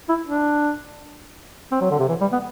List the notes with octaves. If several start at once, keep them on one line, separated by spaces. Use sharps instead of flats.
E4
D4
C4
F#3
D3
C3
E3
G3
B3